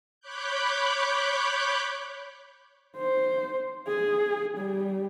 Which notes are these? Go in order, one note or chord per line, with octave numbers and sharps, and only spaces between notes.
C#5 B5 D6 F#6 G6
C5
G#4
G3